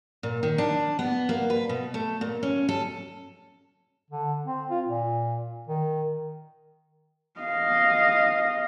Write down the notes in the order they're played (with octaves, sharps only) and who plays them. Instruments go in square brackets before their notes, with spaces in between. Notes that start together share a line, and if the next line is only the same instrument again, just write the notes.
[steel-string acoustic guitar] A#2
D#3
D4
B3
A#3
B4
B2
A3
A#2
C#4
A4
[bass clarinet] D3
C4
F4
A#2
D#3
[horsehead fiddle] D#5 F5